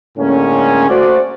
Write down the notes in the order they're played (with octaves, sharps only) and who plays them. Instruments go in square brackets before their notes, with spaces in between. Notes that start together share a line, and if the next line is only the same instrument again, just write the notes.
[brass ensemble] A2 D3 G#3 A#3 C#4
A3 F#4 C5 D5